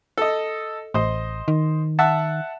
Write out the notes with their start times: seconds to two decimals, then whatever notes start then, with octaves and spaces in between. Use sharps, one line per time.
0.18 A4 D#5
0.94 A1 C5 D#5
1.48 D#3
1.99 E5 F#5 A5